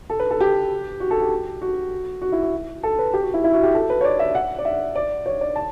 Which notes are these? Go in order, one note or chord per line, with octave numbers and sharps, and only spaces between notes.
A4
B4
A4
G4
F#4
A4
G4
F#4
F#4
E4
F#4
A4
B4
G4
F#4
E4
E4
F#4
G4
A4
B4
C#5
D5
E5
F#5
D5
E5
D5
C#5
D5
A5